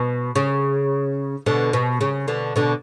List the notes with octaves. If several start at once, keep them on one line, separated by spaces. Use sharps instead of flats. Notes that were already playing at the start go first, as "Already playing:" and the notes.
Already playing: B2
C#3
B2 D3
B2
C#3
B2 D3
B2 D3